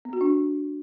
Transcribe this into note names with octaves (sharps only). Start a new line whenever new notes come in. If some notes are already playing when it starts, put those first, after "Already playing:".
B3
F#4
D4